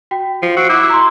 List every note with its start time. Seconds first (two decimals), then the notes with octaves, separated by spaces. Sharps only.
0.11 F#4 G5
0.42 F3
0.57 F#4 E6 C7 D7
0.69 E4 D6 F#6
0.90 A#5 C6